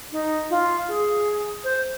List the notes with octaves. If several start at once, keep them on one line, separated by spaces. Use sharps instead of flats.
D#4
F4
G#4
C5